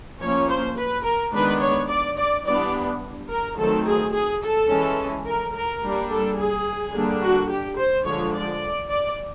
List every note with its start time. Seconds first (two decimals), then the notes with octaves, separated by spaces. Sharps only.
0.20 F3 A#3 C#4 C#5
0.49 C5
0.76 B4
1.04 A#4
1.32 D#3 G#3 B3 D4 B4
1.60 C#5
1.88 D5
2.16 D5
2.44 E3 G3 B3 D4 D5
3.29 A#4
3.57 D#3 F#3 A3 C4 A4
3.85 G#4
4.13 G#4
4.41 A4
4.68 E3 G#3 C#4
5.25 A#4
5.53 A#4
5.82 G3 A#3 D4
6.09 A4
6.38 G#4
6.93 D3 G3 A#3 D4
7.22 F#4
7.49 G4
7.78 C5
8.05 D3 F3 G#3 C#5
8.33 D5
8.90 D5